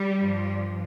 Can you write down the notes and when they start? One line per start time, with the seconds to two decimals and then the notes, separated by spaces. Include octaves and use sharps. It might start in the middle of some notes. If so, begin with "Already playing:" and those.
Already playing: G3
0.18 G2 F3